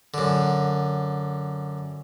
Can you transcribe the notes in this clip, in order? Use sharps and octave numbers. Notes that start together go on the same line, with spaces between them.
F#2 D3